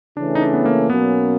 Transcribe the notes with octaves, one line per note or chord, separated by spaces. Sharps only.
C#3 E3 A3 C#4 D4
D#4
D4
B3
A#3
B2 F#3 A#3 B3 C#4